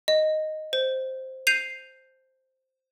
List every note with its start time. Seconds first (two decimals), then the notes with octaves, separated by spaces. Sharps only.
0.08 D#5
0.73 C5
1.47 G6 C7 D#7 F7